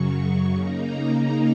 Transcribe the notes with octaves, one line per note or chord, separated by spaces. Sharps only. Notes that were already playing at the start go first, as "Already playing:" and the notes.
Already playing: F#2 C#3 F#3 C#6
C#3 A#3 D#4 A#5